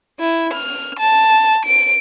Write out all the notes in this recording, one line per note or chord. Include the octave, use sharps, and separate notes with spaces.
E4
F6
A5
D7